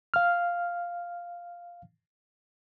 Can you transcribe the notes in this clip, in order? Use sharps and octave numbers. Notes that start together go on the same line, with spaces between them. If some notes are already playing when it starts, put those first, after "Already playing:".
F5 F6